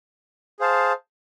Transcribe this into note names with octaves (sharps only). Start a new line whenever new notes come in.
G#4 C5 F5 A5